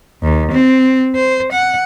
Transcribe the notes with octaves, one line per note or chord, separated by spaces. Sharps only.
D#2
C4
C5
F#5